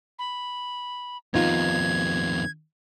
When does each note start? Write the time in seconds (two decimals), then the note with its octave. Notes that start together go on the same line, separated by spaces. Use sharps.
0.19 B5
1.34 F2 D#3 B3 D#4 F4 G#6